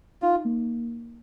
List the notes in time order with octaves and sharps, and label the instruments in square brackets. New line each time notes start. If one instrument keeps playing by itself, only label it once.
[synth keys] D#4 [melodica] F4
[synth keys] A#3